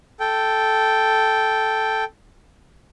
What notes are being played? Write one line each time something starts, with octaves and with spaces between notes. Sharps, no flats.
A4 G5